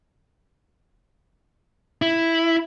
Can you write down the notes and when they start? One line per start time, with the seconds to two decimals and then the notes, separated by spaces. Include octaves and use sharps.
2.02 E4